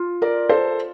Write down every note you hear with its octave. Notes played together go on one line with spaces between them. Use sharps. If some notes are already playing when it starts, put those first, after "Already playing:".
Already playing: F4
A#4 D5
A4 C5